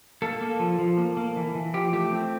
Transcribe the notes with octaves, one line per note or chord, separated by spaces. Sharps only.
A#3 A4
A#3
F3
F3
A#3
A#3
E3
E3
F3 G4
A3 G4
C4